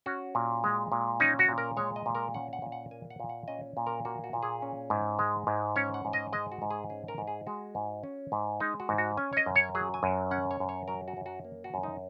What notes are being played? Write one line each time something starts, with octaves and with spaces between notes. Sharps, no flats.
C#4 F#4
A#2
G#3
A#2
C#4 D#4
F#4
A#2
A#4
G#3 C#5
D#5
A#2
A#4
C#4 F#5
F#5
A#2
F#5
A#3 G#5
F#5
A#2
F#5
C#4 D#5
A#2
A#4
A#3 F#4
F#4
A#2
G#4
C#4
G#2
G#3
G#2
C#4 C#5
F#5
G#2
D#5
G#3 D#5
F#4
G#2
G#4
C#4 G#4
A#4
G#2
G#4
G#3 F#4
G#2
C#4
G#2
G#3 D#4
F#4
G#2
F#4
C#4 G#5
C#5
D#5
F#2
C#5
F#3 G#4
G#5
F#2
C#4 F#5
C#5
F#2
C#5
F#3 A#4
F#4
F#2
F#4
A#3
F#4
F#2
D#4